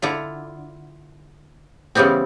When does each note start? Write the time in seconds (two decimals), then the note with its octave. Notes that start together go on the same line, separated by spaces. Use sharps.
0.02 D3 E4 F4
1.95 C#3 E3 G3 B3 C4